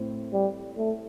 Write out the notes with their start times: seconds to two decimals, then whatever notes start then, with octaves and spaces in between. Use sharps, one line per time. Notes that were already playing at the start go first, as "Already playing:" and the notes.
Already playing: A2 C4
0.33 G3
0.77 A3